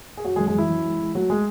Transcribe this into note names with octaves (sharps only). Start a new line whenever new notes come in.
G#4
F#2 F#3 F#4
G#3 G#4
F#2
G#3 G#4
F#2 E3 E4
F#2
G#3
G#3
F#3 A3 F#4
G#3 G#4